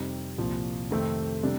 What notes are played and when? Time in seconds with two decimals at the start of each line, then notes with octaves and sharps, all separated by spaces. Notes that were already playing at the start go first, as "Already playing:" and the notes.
Already playing: F2 C3 G3 C4 D#4
0.38 C2 A#2 F3
0.91 F2 C3 D#3 A3 C4
1.43 C3 G3 D4